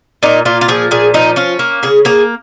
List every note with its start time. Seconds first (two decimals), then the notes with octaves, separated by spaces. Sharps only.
0.23 A#2 D#4
0.45 A#2 F4
0.61 F4
0.68 F3 G#4
0.91 A#2 G#4
1.14 F3 D#4
1.36 C#4 F4
1.59 A#3
1.83 C#3 G#4
2.05 A#3 G#4